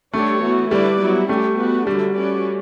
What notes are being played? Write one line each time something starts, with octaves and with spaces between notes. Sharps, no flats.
G3 A3 D4 A4 C#5
E3 B3 F#4
D3 G3 A3 E4 B4 D5
F#3 B3 E4
G3 A3 C#4 G4
B3 F#4 B4
D3 F#3 G3 A3 D4 A4
A3 C#4 F#4 B4 D5